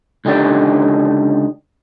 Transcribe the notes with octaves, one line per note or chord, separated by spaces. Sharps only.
C#2 D3 D#4 G4 D5